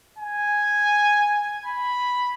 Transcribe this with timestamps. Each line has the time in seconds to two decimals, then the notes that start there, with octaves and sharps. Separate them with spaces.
0.19 G#5
1.66 B5